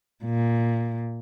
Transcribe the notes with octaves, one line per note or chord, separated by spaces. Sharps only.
A#2